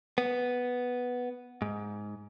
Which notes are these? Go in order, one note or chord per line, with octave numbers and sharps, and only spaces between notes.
B3
G#2